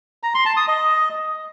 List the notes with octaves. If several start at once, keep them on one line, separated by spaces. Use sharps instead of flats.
A#5
C6
A5
D#6
D#5